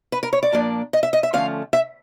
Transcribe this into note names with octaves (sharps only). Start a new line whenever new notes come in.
B4
A#4
C#5
D5
A#2 F3 A#3 D4
D#5
E5
D#5
E5
D3 F3 A3 C#4 F5
E5